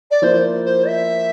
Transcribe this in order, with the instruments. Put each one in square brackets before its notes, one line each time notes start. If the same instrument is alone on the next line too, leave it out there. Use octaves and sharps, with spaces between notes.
[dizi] D5
[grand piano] F3 A#3 E4 [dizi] C5
[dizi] C5
E5